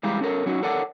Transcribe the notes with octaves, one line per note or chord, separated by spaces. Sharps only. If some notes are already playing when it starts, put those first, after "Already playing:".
E3 G3 G#3 G4 F5 A#5
C#4 A4 A#4 C#5
F#3 C#4 D#4 F#4
A4 A#4 C#5 D5 F#5 A5